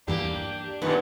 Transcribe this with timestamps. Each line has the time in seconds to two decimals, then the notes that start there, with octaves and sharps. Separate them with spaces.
0.07 E2 G2 E3 A#3 D4 G4
0.82 F#2 A#2 D#3 B3